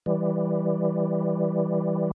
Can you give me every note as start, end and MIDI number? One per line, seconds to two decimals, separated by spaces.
0.06 2.11 52
0.06 2.11 55